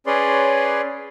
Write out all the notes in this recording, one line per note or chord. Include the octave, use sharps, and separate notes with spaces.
C#4 G#4 B4 C#5 D5 C6